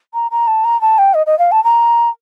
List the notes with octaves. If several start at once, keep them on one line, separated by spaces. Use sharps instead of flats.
A#5
A#5
A5
A#5
A5
G5
D#5
D#5
F5
A5
A#5